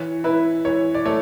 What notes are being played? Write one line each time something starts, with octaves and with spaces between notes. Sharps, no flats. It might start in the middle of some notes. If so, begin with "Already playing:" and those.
Already playing: E3 C#5
E4 B4
E3 C#5
D5
A3 C#5